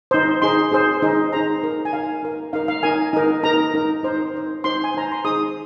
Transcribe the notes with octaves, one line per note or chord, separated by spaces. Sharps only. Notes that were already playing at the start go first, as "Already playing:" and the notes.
D#4 C5
D#4 G#4 C5 C6
D#4 G#4 C5
D#4 G#4 C5
D#4 G#4 C5 A#5
D#4 A#4
G#5
D#4 A#4 F5
D#4 A#4
D#4 A#4 F5
F5
D#4 A#4 G#5
D#4 A#4
D#4 A#4 A#5
D#4 A#4
D#4 C5
D#4 C5
D#4 C5 C6
G#5
D#4 C5 A#5
C6
D#4 G#4 C5 D#6